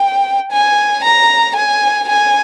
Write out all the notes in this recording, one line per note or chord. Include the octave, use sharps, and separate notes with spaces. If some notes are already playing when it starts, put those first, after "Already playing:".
Already playing: G5
G#5
A#5
G#5
G#5